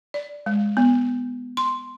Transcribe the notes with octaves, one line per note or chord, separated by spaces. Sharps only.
D5
G#3
B3
C6